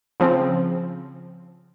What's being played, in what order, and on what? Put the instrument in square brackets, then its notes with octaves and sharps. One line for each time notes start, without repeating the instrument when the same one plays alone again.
[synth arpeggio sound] C#3 F3 C4